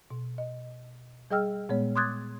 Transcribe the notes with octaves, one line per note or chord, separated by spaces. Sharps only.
B2
D#5
G3 G#4 D#5 G5 E6 F6
A#2 G#3 B3 C#5
C6 D6 D#6 F#6 G#6 A6